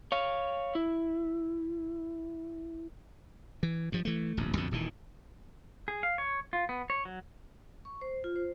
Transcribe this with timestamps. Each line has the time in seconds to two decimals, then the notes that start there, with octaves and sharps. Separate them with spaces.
0.12 C#5 F5
0.75 E4
3.63 E3
3.92 G2 F3
4.05 E3 A3
4.37 D1 A#1 G2
4.57 A#1 F2 B2 D3
4.71 D#1 A#2 D#3 E3
5.88 G#4
6.03 F5
6.18 C#5
6.53 F4
6.69 B3
6.90 C#5
7.05 F#3
7.85 C#6
8.01 C5
8.24 F4
8.36 C5